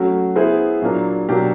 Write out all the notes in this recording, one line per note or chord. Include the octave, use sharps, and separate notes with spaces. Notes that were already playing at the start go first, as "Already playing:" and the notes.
Already playing: F#3 A3 C#4 F#4
B3 E4 G#4 C5 E5
A#2 F#3 A#3 D4
B2 F#3 A#3 D4 G4